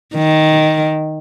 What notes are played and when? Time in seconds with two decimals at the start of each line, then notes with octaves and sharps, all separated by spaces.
0.14 D#3